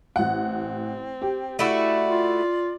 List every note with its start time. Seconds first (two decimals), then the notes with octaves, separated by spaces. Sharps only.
0.16 A1 C4 F#5
1.22 G4
1.59 A3 E4 F#4 D5
2.09 F4